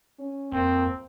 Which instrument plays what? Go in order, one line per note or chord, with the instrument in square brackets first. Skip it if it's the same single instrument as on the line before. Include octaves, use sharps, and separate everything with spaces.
[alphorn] C#4
[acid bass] F2 [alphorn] A#3 [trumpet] C4